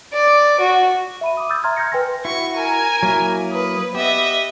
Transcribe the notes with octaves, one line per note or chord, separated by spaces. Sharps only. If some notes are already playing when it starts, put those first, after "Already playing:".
D5
F#4
E5 B5 D#7
D6 D#6
D#6 E6 G6 A6
E5 A#5 C6 F6 G#6
F6 G6 G#6 A#6 C#7
B4 G5 G#5 C6 A#6
E4 F#4 C#6
A#4 G#5 A#5
F#3 A#3 E4
B4 D#6
B3 G4 D#5 E5